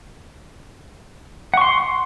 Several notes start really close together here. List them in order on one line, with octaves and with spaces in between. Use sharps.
F#5 C#6 C6